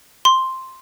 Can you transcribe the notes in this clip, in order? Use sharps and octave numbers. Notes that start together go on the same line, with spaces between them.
C6